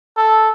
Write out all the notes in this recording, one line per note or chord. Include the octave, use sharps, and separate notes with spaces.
A4